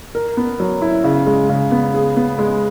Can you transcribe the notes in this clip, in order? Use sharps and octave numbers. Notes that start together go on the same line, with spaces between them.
A#4
B3
F#3
E4
C#3
G#3
C#3
B3
G#4
B3
G#3